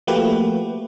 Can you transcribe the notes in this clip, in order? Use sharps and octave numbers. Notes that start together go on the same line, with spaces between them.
F3 A3 A#3 F#4 G4 B4